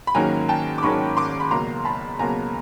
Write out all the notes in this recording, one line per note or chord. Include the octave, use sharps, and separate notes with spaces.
B5
G#2 D#3 F#3 A#3 C#4 G#5 A#5
G5 A5
D6
G#2 D#3 F#3 A#3 C#4 B5 C#6
C6 D6
B5
C#2 B2 F#3 A#3 A#5 C6
A5 B5
C#2 B2 F#3 A#3 G#5 A#5